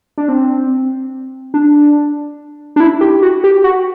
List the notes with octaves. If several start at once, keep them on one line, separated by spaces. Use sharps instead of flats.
D4
C4
D4
D4
E4
G4
F#4
G4
F#4